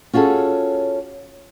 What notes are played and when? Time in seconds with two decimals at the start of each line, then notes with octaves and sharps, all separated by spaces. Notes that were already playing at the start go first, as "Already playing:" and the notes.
0.13 C#4 F4 F#4 G#4 A4